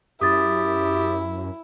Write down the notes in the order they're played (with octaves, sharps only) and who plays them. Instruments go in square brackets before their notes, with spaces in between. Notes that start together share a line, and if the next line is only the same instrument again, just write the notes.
[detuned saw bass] F#2 [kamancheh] E4 [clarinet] G4 [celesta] D#6 A6